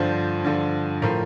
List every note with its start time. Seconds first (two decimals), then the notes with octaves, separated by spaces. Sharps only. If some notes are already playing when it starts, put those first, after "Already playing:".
Already playing: G2 D3 F3 C5
0.44 G2 D3 F3
1.02 A2 F3 A#4